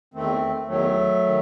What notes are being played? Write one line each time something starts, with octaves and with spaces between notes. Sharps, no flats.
E2 D#3 A3 C4
E2 D#3 F#3 A3
D#3